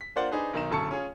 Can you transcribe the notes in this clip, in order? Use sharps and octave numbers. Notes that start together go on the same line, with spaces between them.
B6
A#3 D4 F4 C5 D5 F#5
D4 D#4 G#4 B4 C5
B1 D#3 D#4 A#5 E7
D1 F#2 A4 A5 C#6 C#7
C#4 F4 G#4